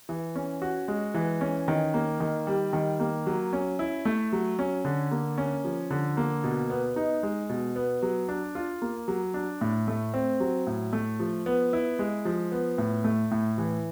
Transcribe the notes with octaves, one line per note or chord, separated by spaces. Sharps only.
E3
C#4
F#4
G#3
E3
C#4
D#3
A#3
D#3
G3
D#3
A#3
F#3
C#4
E4
A3
F#3
C#4
D3
A#3
C#4
F3
D3
A#3
B2
B3
D#4
G#3
B2
B3
F#3
D4
F4
A#3
F#3
D4
A2
A3
C4
F#3
A2
A3
F3
B3
E4
G#3
F3
B3
A2
A3
A2
E3